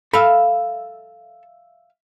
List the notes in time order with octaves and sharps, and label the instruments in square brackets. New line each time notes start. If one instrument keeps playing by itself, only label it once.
[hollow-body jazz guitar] A4 B5 [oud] E5 F5